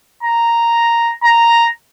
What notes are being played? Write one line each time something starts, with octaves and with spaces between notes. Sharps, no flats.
A#5
A#5